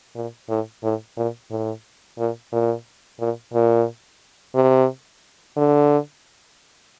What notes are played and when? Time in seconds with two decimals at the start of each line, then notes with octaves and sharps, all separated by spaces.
0.16 A#2
0.50 A2
0.83 A2
1.17 A#2
1.51 A2
2.19 A#2
2.52 A#2
3.20 A#2
3.54 A#2
4.55 C3
5.57 D3